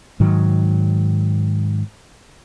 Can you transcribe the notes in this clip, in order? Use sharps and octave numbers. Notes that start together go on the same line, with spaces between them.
G#2 D#3 F#3